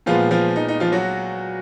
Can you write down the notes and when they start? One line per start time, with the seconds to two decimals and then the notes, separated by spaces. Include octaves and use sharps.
0.06 A#2 F3 G#3 B3 F4
0.31 F3 F4
0.56 D#4
0.68 D#4
0.80 F3 F4
0.92 F#3 F#4